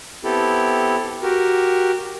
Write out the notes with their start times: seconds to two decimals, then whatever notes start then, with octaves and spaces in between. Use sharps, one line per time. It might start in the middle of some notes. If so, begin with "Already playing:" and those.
0.24 B3 C4 E4 G4 A4
1.22 F#4 G4 A#4